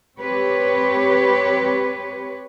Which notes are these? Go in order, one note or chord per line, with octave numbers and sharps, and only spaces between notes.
C4 G4 B4 C#5